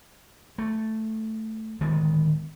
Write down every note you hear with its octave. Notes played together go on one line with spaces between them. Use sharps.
A3
D1 D#3 G#3 B3